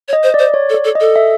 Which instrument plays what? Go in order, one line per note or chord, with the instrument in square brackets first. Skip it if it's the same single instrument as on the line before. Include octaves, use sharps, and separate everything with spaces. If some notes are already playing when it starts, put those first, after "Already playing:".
[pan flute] C#5
[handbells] D#5
[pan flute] C5
[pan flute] C5 [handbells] D5
[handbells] C#5
[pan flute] A4
[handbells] D5
[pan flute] A4
[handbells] D#5
[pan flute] A4
[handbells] E5